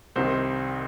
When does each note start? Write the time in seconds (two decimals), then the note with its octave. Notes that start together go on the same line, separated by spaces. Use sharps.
0.16 C2 C3 D#3 C5